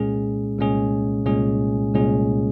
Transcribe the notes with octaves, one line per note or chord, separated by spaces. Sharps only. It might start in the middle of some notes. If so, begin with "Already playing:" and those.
Already playing: C2 A#2 G#3 C#4 G#4
C2 A#2 G#3 C#4 G#4
C2 A#2 G#3 C#4 G#4
C2 A#2 G#3 C#4 G#4